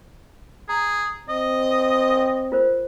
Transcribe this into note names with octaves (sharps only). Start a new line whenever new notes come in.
G#4 A#5
C4 D#5
F4 A#4 C5